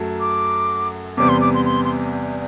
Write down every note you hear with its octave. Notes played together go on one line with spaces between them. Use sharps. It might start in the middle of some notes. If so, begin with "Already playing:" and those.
Already playing: F#2 F#3 A3
D6
E2 C3 G3 B3 D6
C6
D6
C6
C6
C6